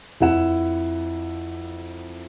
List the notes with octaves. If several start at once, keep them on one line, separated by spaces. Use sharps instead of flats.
F2 C4 E4 F#5 E7